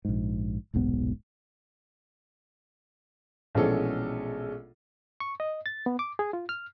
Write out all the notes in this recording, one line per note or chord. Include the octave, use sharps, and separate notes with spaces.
A#1 G#2
D#1 B1 G#2 B3
A#1 B2 E3 G#3 C#4 A4
C#6
D#5
A6
B3
D6
G#4
F4
F6